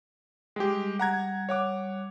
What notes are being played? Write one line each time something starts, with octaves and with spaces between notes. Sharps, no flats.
G3 G#3 G4
F#5 A#5 G#6
C#5 F#5 D6